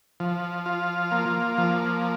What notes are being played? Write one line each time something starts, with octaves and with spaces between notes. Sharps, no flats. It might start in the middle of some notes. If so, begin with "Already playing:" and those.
F3
F4
A#3
F3